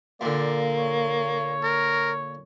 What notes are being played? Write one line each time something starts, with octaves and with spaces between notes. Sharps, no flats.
A#2 D3 A#3 D5
C#5
A#4